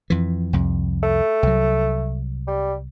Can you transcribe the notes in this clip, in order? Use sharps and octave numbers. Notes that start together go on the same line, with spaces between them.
F2 E3
C2 F2
A3
C2 F#3
G3